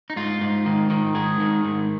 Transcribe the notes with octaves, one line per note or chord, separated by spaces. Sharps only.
D#4
G#2 F4
G#2
D#3
D#3
G#2 G#4
D#3
G#2